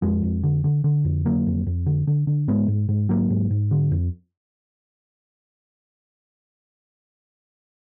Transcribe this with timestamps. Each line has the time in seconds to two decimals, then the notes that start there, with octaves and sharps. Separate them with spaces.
0.02 F2 F3 G#3
0.23 F2
0.43 D3
0.64 D3
0.84 D3
1.05 F2
1.25 D3 F#3 A#3
1.47 F2
1.67 F2
1.86 D3
2.07 D3
2.27 D3
2.48 G#2 G#3 B3
2.68 G#2
2.89 G#2
3.09 G#2 F#3 A#3
3.30 G#2
3.51 G#2
3.71 D3
3.91 F2